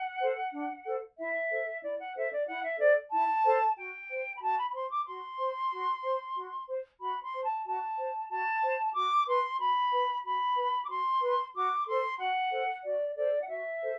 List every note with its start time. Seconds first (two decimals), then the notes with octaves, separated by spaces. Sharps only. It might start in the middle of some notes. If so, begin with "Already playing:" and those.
Already playing: F#5
0.20 A4 C5
0.53 D4
0.86 A4 C5
1.18 E4 E5
1.51 A4 C5
1.83 E4 D5
1.98 F#5
2.15 A4 C5 E5
2.31 D5
2.47 E4 F#5
2.63 E5
2.79 A4 C5 D5
3.12 E4 A5
3.45 A4 C5
3.77 F#4 G5
4.09 C5
4.35 B5
4.42 F#4 A5
4.58 B5
4.69 B5
4.74 C5 C6
4.90 D6
5.06 F#4 C6
5.39 C5
5.71 F#4
6.03 C5
6.35 F#4
6.68 C5
7.00 F#4 B5
7.22 C6
7.33 C5
7.44 A5
7.65 F#4 A5
7.98 C5
8.30 F#4 A5
8.63 C5
8.95 F#4 D6
9.27 B4 C6
9.59 F#4 B5
9.91 B4
10.25 F#4 B5
10.56 B4
10.84 D6
10.89 F#4 C6
11.22 B4
11.54 F#4 D6
11.86 A4 C5 C6
12.19 F#4 F#5
12.51 A4 C5
12.84 F#4 D5
13.16 A4 C5 D5
13.41 F#5
13.48 F#4 E5
13.81 A4 C5